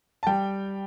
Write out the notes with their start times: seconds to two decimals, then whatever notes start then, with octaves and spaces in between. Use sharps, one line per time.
0.23 A5
0.27 G3 G5